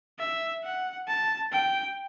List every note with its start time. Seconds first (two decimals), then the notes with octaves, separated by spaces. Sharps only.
0.19 E5
0.64 F#5
1.08 A5
1.52 G5